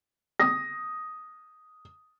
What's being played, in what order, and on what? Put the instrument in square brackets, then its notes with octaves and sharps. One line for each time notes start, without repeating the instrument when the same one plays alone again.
[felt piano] D#6 A#6